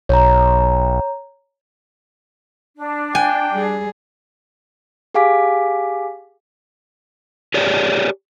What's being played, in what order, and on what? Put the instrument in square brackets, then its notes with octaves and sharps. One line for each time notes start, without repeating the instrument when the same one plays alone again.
[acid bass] B1 [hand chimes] C#5 A#5
[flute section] D4
[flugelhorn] G5 [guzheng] G#5
[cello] G3 G#4
[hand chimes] G4 G#4 F5 G#5 D6 B6
[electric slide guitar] G4 G#4 A#4 C#5 D5